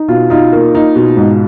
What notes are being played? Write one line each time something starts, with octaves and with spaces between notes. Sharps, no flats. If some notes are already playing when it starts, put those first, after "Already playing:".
Already playing: D#4
B2 F4
D#4 F4
A#3
D#4
B2
G#2